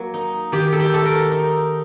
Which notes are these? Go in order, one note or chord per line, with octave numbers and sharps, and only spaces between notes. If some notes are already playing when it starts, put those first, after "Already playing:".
Already playing: F#3 A#3
D#4
D#3 G4
A4
G4
A3 A4
A#4
D#4